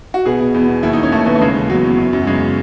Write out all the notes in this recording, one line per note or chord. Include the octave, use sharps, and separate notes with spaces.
F#4
B2 G#4
B2
E2
B2
D#2 E4
D#3 D#4
C#4
D#2 A3
D#2 B3
A3
C#3 G#3
E3
E2 F#3
E2
F#2
F#2
F#3
C#3 G#3